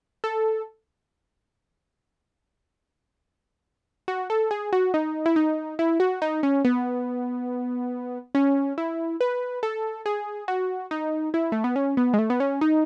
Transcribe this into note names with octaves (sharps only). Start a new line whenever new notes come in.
A4
F#4
A4
G#4
F#4
D#4
E4
D#4
E4
F#4
D#4
C#4
B3
C#4
E4
B4
A4
G#4
F#4
D#4
E4
A3
B3
C#4
B3
G#3
A3
B3
C#4
D#4